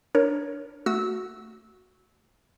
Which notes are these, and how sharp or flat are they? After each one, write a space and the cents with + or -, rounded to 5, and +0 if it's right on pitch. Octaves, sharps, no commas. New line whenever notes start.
D4 +0 A#4 +5 C#5 +0
A3 +20 F#4 +0 E6 -20